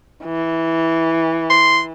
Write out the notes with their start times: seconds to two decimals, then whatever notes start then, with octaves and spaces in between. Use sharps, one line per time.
0.24 E3
1.50 C6